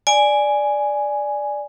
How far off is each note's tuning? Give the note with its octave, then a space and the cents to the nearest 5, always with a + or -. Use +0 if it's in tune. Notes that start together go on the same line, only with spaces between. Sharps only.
D5 +0 G#5 +0